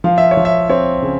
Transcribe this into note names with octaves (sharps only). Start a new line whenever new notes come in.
F3 F5
E5
C#5
F3
E5
C4 C#5
C#3